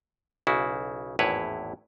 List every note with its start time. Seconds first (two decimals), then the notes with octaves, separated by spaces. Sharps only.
0.47 B1 C#3 E4 F#4
1.19 G#1 E2 A2 E4 B4 C#5